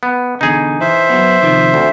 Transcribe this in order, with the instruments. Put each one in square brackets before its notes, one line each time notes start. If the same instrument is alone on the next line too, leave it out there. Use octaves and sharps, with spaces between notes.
[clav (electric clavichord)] B3
[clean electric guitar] E2 B2 D3 [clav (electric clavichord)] D#4 G#4
[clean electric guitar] E3 [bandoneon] C5 E5
[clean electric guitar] F#3 B3
C3 D#3 F3
[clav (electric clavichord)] D2